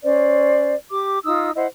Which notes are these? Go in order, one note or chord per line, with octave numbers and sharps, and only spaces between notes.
C#4 C5 D5
G4 D6
D#4 F4 D#6 E6
E4 C5 D#5 F#5